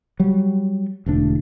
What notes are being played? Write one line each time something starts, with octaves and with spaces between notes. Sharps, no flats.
F#3 G3
E1 D2 D4